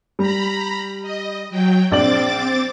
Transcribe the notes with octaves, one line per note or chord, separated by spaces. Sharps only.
G3 A#5 B5
D#5
F#3 G5
A#1 C4 D5 D6 A6 F#7